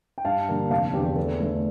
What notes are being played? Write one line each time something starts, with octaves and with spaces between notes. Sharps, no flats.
G5
G2 F5 A5
D3 G3 A#3
F1 F5 A5
E2 D3 G4
G4
E2 A4
D3 A3